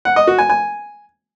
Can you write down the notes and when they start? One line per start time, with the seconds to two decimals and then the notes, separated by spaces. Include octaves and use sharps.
0.05 F#5
0.16 D#5
0.27 F#4
0.38 G#5
0.50 G#5